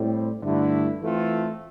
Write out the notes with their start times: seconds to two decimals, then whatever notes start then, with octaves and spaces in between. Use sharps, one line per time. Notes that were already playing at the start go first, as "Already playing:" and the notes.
Already playing: A2 G3 C4
0.41 G2 D3 A3 E4
1.01 E3 A3 C4 F4 A4